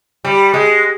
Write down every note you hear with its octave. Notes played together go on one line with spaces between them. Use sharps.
G3
G#3